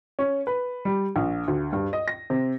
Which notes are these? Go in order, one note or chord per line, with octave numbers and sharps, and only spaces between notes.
C#4
B4
G3
A#1
D2
G2
D#5
A#6
C3